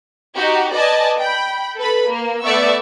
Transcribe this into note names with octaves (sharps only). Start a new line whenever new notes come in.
D#4 F#4 G4
B4 D5 D#5 G#5 A5
G5 B5
A4 B4 B5
A#3
A3 B3 D5 E5 C#6 E6